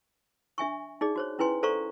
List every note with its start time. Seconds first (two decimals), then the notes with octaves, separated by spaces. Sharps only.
0.58 D4 E5 G#5 C#6
1.01 D#4 G#4 D5
1.16 F#4 C5 C#5
1.39 C#4 E4 B4 G#5 C6
1.63 A4 C5 D5 F5 A#5 C#6